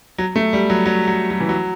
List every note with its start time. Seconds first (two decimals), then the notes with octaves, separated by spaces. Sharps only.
0.18 F#3
0.36 A3
0.53 G3
0.70 F#3
0.86 F#3
1.08 F#3
1.30 F#3
1.40 E3
1.49 F#3